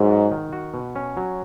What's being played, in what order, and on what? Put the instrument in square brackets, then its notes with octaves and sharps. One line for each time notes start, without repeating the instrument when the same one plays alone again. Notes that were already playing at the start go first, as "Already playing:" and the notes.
Already playing: [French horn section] G#2 [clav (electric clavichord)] F#3
[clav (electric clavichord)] F#4
D#3
F#4
B2
C#4
F#3